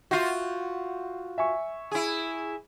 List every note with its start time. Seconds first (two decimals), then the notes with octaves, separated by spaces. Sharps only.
0.11 F4 F#4 E5 G6 C7
1.38 E5 G#5 C#6
1.92 E4 G#4